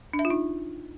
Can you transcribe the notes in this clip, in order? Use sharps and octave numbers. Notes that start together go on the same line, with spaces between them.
D4
E5
F4
D#4